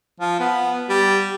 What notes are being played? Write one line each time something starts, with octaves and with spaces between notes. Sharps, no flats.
F3
B3
G3